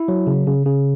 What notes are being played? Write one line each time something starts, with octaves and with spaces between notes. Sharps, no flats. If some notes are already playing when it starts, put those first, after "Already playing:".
Already playing: E4
F#3
C#3
C#3
C#3